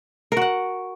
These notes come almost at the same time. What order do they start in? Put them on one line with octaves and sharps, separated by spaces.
A#4 F#4 F#5